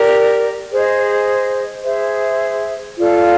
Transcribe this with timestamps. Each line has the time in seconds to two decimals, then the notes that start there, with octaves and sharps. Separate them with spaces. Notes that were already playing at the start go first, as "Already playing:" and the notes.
Already playing: G4 A#4 D5
0.72 G#4 C5 D#5
1.84 G#4 C5 E5
2.97 F4 A4 D5 F5